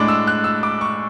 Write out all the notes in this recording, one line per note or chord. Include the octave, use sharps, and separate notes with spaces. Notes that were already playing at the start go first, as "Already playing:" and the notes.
Already playing: A2 G#3 D4 D6
E6
F#6
E6
D6
C#6